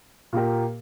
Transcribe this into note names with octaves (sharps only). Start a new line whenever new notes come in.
A#2 A#3 G4 A#4